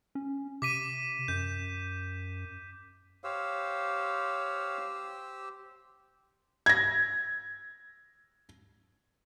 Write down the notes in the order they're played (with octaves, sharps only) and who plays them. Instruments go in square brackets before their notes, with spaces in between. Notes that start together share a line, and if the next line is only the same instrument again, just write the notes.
[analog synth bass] C#4
[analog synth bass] C3 [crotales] D6 B6 D#7
[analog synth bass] F#2 [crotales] G6
[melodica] G4 C5 E6 [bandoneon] C#5 F5
[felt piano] G#6 A#6